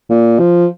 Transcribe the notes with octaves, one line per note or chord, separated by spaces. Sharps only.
A#2
F3